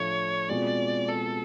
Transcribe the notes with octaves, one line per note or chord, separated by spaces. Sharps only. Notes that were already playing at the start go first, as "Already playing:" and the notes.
Already playing: A2 F3 A3 D4 C#5
B2 G#3 C4 F4 D5
A4